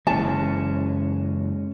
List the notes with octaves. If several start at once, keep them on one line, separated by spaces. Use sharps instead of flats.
F#1 E3 G#3 C#4 A5